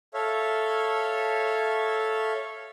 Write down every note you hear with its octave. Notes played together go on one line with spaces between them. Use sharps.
A4 C#5 E5 F5